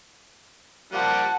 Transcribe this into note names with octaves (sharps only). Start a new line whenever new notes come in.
F3 G3 A#3 F#5 A5